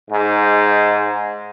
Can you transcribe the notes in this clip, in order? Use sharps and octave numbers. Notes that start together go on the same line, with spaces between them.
G#2